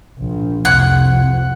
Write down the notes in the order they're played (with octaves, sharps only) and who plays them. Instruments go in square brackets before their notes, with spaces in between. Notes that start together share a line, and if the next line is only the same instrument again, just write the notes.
[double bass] A#1
[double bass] C2 F2 [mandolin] F#5 F#6